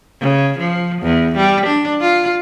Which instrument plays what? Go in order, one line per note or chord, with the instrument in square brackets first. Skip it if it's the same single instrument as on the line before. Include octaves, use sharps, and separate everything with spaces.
[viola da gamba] C#3
F3
E2
G3
D4
F4